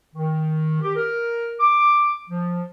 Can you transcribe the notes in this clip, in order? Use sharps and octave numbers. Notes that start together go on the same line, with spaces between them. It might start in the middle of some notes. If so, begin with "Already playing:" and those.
D#3
G4
A#4
D6
F3